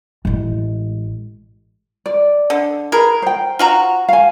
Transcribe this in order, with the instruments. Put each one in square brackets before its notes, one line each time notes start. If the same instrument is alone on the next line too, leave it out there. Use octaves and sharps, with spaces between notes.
[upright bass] A1 G#3
[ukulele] D5
[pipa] D3
[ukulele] G#4 B4 [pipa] A#4
[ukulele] C5 G5
[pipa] F4 F#4 A#5
[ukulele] F5 G#5